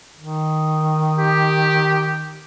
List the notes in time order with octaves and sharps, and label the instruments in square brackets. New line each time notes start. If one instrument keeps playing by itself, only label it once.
[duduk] D#3
[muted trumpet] G4